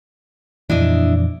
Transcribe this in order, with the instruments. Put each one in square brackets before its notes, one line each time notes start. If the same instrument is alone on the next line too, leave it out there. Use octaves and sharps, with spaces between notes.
[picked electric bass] F2 A#2 E3 [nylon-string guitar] D4 E4 D#5